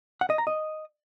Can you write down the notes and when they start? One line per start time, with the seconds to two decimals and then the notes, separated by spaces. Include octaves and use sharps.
0.21 F#5
0.30 D#5
0.38 A#5
0.47 D#5